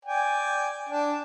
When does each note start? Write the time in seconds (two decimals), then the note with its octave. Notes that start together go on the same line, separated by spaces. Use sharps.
0.05 D5 G5 G#5
0.89 D4